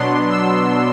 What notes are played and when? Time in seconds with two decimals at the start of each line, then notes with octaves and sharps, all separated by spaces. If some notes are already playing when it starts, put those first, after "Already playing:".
Already playing: B2 F#3 B3 D4 C6
0.30 E6